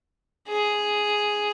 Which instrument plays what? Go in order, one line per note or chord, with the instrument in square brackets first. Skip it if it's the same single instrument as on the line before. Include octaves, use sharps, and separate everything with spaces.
[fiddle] G#4